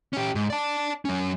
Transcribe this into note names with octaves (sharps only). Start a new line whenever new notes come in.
C#4 G4
G#2
D5 A5
F#3 C#4